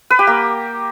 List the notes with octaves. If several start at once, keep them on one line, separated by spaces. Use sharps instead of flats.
B4
G4
A#3